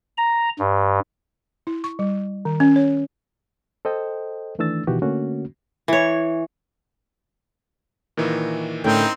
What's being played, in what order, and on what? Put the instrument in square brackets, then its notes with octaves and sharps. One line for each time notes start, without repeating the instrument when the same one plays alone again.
[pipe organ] A#5
G2
[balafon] E4
C#6
G3
D#3
C#4
C#5
[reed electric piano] A4 C5 D#5 G5
D#3 E3 A3 D4 E6 A6
B2 D#3 E3 F#4 G4
D3 A3 A#3 C#4 F#4
[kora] E3 C#5
[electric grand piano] A#2 D#3 E3
[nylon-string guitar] A2 D3 [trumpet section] C4 D#4 G5 [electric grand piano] C#4 E4 A#4